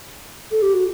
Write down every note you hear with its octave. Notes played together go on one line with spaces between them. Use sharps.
A4
G4
F#4